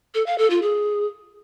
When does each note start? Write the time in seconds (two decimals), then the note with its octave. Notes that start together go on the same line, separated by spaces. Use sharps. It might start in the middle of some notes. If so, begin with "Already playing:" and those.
0.14 A4
0.26 F5
0.38 A4
0.50 F4
0.62 G#4